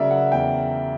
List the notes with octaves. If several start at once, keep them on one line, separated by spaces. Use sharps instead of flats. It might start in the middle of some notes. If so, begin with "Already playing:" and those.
Already playing: C#3 F#3 A#4 D5 E5
F#5
E2 G5